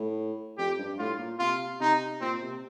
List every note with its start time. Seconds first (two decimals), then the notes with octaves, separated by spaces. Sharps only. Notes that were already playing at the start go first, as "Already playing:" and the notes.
Already playing: A2
0.58 F2 G4
0.79 G2
0.98 A2 F4
1.19 A#2
1.39 C3 F4
1.80 C3 D#4
2.21 A#2 C4
2.42 C3